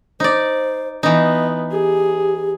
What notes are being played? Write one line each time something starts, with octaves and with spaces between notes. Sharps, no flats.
D#4 C5 D5
E3 B3 D#4 D#5
G4 G#4